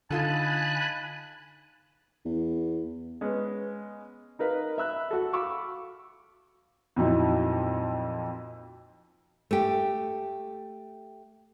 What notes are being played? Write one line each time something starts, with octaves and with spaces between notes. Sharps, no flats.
D3 D#4 F4 A4 G#5 A5 B5 F#6
E2
G#3 B3 C#4
D#4 A#4 B4 F5
E5 B5 E6 F#6
F#4 A4
F5 B5 C#6 D6 E6
F2 A#2 F3 F#3 D#4 E4
A3 G4